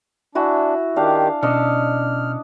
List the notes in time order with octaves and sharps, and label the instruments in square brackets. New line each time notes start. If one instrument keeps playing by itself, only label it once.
[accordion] D4 [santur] E4 F#4 G#5
[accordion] D#3 G4 [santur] D4 F5
[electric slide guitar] B2 C#4 [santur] D4 D#5 E6 [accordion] F6